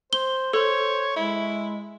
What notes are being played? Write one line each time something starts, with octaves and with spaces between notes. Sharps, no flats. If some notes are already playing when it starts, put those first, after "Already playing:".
C5 G7
A4 C5 C#5
G#3 E4